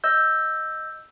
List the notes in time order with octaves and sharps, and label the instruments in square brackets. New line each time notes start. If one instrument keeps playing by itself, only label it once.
[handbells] D#5 E6 G6